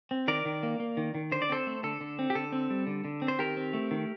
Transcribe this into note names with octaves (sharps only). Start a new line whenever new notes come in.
C4
D#3 A#4 D5
D#3
A#3
A#3
D#3
D#3
D3 C5
D5
C4 A4 C5
A3
D3 A4
D3
C4
G4
D3 A4
C4
G3
D3
D3
C4
C5
D#3 G4 A#4
C4
A3
D#3